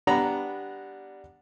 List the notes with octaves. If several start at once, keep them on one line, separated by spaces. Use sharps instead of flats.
G3 B3 D4 F#5 A#5 B5